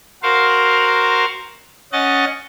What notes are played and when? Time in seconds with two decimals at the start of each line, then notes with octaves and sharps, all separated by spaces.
0.23 F#4 A#4 C5 F5
1.92 C#4 D#5 F#5 A6